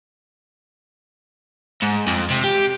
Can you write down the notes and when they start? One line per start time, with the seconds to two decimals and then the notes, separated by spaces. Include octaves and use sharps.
1.82 G#2
2.07 F2
2.30 C3
2.44 G4